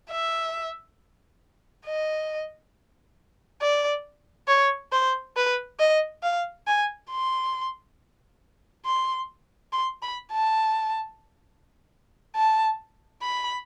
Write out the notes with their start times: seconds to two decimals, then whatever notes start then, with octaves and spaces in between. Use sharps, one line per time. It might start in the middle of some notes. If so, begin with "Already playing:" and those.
0.10 E5
1.86 D#5
3.61 D5
4.48 C#5
4.92 C5
5.36 B4
5.79 D#5
6.23 F5
6.67 G#5
7.11 C6
8.86 C6
9.72 C6
10.02 B5
10.32 A5
12.36 A5
13.22 B5